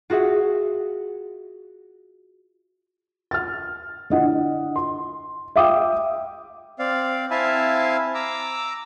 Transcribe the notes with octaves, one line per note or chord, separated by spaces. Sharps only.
F4 F#4 G#4 E5 F#5
F6 A6
D3 E4 D#5 F#5
C6
E5 F5 G5 D6 D#6
C4 D5 F5
C4 E4 E5 F5 G#5 A5
A#5 D6 E6